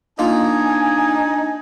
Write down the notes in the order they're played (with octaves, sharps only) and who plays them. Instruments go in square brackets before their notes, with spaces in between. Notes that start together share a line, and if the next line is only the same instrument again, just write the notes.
[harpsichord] A#3 F4 [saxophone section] D4 D#4 [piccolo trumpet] G#5